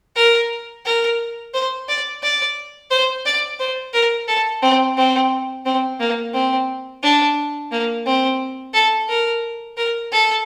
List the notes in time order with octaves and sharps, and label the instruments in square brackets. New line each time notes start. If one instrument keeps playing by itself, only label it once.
[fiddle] A#4
A#4
C5
D5
D5
C5
D5
C5
A#4
A4
C4
C4
C4
A#3
C4
D4
A#3
C4
A4
A#4
A#4
A4